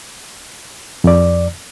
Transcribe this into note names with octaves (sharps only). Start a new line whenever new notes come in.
F2 D5